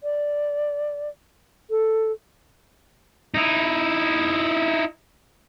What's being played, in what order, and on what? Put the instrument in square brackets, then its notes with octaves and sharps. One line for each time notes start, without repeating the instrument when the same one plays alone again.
[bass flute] D5
A4
[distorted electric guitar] D#4 E4